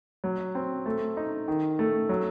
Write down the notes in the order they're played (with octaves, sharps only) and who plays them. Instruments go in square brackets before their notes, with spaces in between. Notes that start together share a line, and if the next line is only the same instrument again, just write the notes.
[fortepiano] F#3
C4
A3
D#4
D#3
A3
F#3